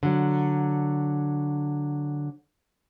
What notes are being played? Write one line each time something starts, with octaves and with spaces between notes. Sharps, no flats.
D3 F#3